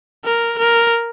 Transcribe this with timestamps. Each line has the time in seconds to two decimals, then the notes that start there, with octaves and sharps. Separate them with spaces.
0.25 A#4
0.59 A#4